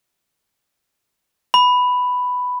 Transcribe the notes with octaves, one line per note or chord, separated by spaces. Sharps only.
B5